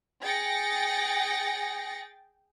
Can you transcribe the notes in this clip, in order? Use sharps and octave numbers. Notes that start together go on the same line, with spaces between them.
G#4 G5 A6 A#6 C#7